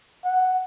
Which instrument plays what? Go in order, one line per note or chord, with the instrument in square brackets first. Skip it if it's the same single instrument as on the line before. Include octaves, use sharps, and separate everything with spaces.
[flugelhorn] F#5